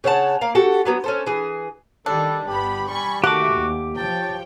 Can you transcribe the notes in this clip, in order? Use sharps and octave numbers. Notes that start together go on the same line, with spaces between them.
C#3 C#5 F#5 A5
A#3 F5
F#4 G4 A4 F#5
E3 F#3 B3
C#4 A4 C5
E3 G#4
D#3 G3 D4 A4
G1 B3 G4 B5
G3 G#5 B5 C#6
D#3 A3 A#3 F#4 G4 F#5 D6
D#2
F3 C#5 G5 A5